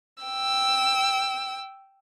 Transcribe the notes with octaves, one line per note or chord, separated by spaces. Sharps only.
G5 E6